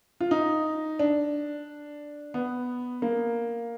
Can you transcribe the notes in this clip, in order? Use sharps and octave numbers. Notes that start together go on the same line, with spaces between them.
F4
D#4
D4
B3
A#3